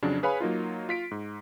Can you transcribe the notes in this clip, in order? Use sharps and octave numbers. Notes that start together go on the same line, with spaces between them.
F2 C#3 F#3 D4
G#4 B4 C#5 F5 G#5 B5
F#3 A#3 D#4 F4
F4 B6 D7
G#2